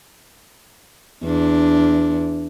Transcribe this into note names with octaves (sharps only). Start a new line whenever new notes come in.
E2 D4